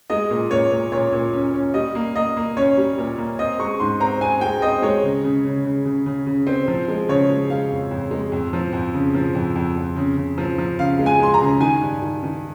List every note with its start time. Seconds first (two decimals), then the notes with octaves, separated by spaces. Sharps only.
0.10 G#3 D#5
0.30 A#2
0.51 A#2 C#5
0.71 A#2
0.92 A#2 C#5
1.13 A#2
1.33 C#4
1.54 C#4
1.74 G3 D#5
1.95 A#3
2.16 A#3 D#5
2.37 A#3
2.57 C#4 C#5
2.77 G3
2.98 A#2
3.18 A#3
3.39 C4 D#5
3.59 G#3 C#6
3.80 G#2 C6
4.00 C4 A#5
4.21 C4 G#5
4.41 G#3 G5
4.62 C4 D#5
4.82 G#3 C#5
5.03 C#3
5.24 C#3
5.45 C#3
5.65 C#3
5.85 C#3
6.06 C#3
6.27 C#3
6.47 C4
6.68 F3
6.88 G#3
7.09 C#3 C#5
7.30 G#3
7.50 G#3 F5
7.71 F2
7.91 F2
8.11 G#3
8.32 F2
8.53 F3
8.73 F2
8.94 C#3
9.15 F3
9.35 F2
9.56 F2
9.76 F2
9.96 C#3
10.17 C#3
10.38 F3
10.58 F3
10.79 C#3 F5
10.99 G#3
11.06 G#5
11.20 G#3 C6
11.34 A#5
11.41 C#3
11.61 D#3 G#5
11.81 G2
12.02 D#3
12.23 D#3